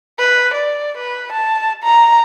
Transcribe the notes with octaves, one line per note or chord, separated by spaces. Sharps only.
B4
D5
B4
A5
A#5